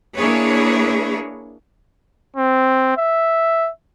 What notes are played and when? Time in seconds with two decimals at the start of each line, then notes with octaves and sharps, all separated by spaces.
0.16 A#3 D4 E4 G#4 B4 C#5
2.37 C4
2.97 E5